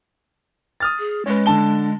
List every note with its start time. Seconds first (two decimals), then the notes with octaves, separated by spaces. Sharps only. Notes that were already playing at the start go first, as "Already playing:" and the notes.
0.80 D#6 F6 A6
0.99 G#4
1.26 G#3 C#4 B4
1.46 D3 A5 G7